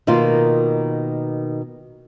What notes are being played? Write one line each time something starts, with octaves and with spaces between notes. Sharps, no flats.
B2 D#3 A#3 F4